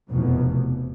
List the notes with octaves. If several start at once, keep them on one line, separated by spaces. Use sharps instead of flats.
F1 E2 B2